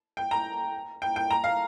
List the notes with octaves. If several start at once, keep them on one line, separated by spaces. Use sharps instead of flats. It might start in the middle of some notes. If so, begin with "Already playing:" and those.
G5
A#5
G5
G5
A#5
F5